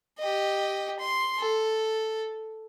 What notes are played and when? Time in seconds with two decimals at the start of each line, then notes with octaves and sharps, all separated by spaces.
0.19 G4 D#5
0.99 C6
1.38 A4